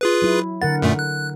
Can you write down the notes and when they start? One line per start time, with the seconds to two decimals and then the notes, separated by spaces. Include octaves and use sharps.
0.01 F4 G#4 B4
0.22 F#3 E4
0.62 D3 A#4 F#5 A6
0.82 F#2 A#2 A3
0.99 F#6